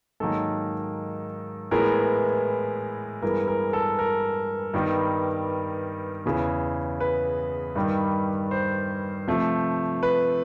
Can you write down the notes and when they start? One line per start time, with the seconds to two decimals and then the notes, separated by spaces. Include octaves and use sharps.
0.20 G#2 D#3 F#3 A#3 A4
1.71 A2 E3 G#3 B3 A#4
3.22 G2 E3 G#3 B3 A#4
3.48 A#4
3.73 A4
3.99 A#4
4.74 G2 D#3 G3 B3
6.25 E2 C#3 E3
7.00 B4
7.76 G2 D#3 G3
8.51 C5
9.27 C3 F3 A3
10.03 B4